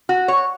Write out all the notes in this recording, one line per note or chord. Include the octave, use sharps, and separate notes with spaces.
F#4
C#5